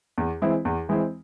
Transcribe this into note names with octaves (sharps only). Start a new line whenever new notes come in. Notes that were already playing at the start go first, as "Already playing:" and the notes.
E2
E3 G#3 C4 E4
E2
E3 G#3 C4 E4